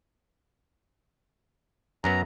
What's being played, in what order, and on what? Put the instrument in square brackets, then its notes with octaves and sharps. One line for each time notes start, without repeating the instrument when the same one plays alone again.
[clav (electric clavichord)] F#2 F#3 B3 [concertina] A#5